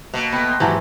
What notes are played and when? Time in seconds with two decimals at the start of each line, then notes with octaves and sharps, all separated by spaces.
0.14 B2 A#3
0.32 A3 B3 G5
0.48 C6 G6 A#6
0.60 G#1 E3 F#3 G4 A4 F#5